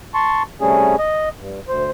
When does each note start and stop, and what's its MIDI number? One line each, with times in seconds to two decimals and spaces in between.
0.14 0.43 81
0.14 0.43 84
0.14 0.43 85
0.61 0.96 48
0.61 0.96 55
0.61 0.96 57
0.61 0.96 61
0.61 0.96 68
0.99 1.29 75
1.39 1.60 43
1.68 1.91 38
1.68 1.91 72